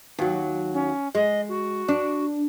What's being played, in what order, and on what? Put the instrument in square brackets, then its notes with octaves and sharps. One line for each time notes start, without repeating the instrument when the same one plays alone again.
[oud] D#2 F#3
[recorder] C#4
[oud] G#3 [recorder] D#5
[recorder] F#4
[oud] D4